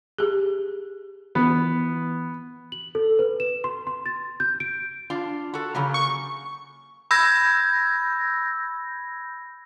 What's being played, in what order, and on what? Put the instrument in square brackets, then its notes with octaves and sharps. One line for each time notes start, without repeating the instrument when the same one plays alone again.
[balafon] G4 G#4
[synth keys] E3 [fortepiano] B3
[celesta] F#7
A4
B4
E7
C6
C6
A6
G6
D7
[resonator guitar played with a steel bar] D4 F4
F#4 A4
C#3 F#3 A#3
[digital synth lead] C#6
[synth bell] B5 E6 G6 G#6 A#6